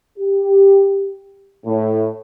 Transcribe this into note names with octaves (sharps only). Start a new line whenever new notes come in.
G4
A2